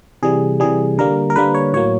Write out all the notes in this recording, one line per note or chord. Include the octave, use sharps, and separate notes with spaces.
C3 E3 G3 G#4
C3 E3 G3 G#4
D3 G3 A#3 A#4
A#4
D3 G3 A#3 B4
C#5
A2 F#3 A#3 C#5